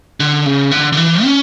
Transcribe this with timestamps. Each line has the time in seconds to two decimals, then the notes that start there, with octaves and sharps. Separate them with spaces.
0.20 D3
0.46 C#3
0.71 D3
0.93 D3
0.97 E3
1.24 C#4